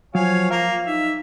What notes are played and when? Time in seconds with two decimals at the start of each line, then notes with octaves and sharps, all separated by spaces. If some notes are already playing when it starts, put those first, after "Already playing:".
0.15 F3 F#3 C#5 F5 G#5
0.51 A#3 A#4 F5
0.87 D#4 E5